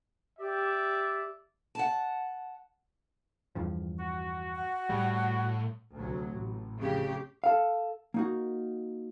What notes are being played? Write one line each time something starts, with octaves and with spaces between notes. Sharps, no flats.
G4 D5 E5
F#5 A5
E2 G2 F3
F#4
F#5
A2 G3
D2 C3 F#3
A1
F2 C#3 G4
A4 F5
A#3 D#4 F#4